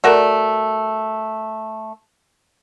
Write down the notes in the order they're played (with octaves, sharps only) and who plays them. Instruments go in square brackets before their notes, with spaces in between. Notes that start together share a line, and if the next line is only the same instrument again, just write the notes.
[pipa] A3 F#4 A#4 D5